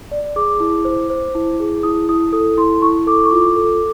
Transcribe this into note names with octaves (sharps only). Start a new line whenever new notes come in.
D5
G#4 D6
E4
C5
C5
E4
G#4
E4 D#6
E4 D#6
A4 D#6
E4 C6
E4 C#6
A4 D6
C#6
F4 D6
A4